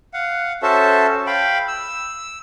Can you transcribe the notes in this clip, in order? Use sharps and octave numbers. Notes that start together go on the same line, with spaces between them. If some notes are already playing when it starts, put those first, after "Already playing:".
F5 F#5
C#4 F#4 A4 C5 E5 A5
F5 G5 B5
E6